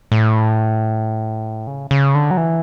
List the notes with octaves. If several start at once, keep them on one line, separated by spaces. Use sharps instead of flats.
A2
C#3
C#3
D3
F#3
E3